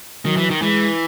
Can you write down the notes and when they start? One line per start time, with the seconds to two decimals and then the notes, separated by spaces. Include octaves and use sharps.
0.25 D#3 F#3
0.37 E3
0.50 D#3
0.62 E3 G#3